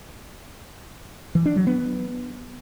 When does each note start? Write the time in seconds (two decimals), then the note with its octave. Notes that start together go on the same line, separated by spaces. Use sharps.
1.35 E3
1.46 D4
1.56 F#3
1.67 B3